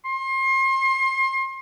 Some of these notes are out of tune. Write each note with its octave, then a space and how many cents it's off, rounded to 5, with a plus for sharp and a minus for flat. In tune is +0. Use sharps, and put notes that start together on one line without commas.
C6 +35